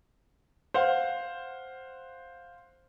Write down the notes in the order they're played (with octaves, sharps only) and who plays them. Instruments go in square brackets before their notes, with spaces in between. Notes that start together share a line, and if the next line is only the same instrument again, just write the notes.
[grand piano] C5 F5 F#5